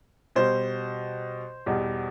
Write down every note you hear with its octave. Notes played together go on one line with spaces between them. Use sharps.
B2 G3 C5
E2 B2 G3